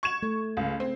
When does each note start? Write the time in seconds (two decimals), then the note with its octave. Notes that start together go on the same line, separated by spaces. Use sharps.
0.03 C#6 G#6 E7
0.23 A3
0.57 C#2
0.80 C4